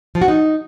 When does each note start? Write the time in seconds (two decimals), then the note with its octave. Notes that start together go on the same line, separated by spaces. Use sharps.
0.15 F3
0.22 F#4
0.28 D#4